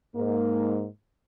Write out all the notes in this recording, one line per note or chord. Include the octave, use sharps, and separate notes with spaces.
G#2 A#3